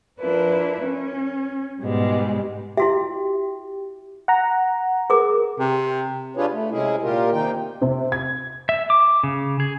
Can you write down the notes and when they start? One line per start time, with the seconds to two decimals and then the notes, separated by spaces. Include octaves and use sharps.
0.20 F3 D4 E4 F4 A#4 B4
0.84 C#4
1.81 G#2 B2 G3 G#3 B3
2.77 E4 F#4 G4 E5
4.28 F#5 A#5
5.10 G#4 A#4 D6
5.60 C3
6.35 D4 F4 G4 G#4 B4 C#5
6.52 A3
6.71 C3 G#3 C#4 E4 G#4
7.02 A#2 F4 G4 A#4
7.32 C3 D#3 A#3 D#4 G5
7.82 C3
8.12 G#6
8.69 E5
8.90 D6
9.23 C#3
9.60 G#4